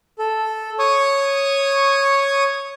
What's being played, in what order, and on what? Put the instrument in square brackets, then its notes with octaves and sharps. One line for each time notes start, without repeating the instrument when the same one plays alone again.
[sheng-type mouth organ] A4
C#5 C#6 D#6